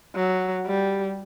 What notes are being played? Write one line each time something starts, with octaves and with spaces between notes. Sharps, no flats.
F#3
G3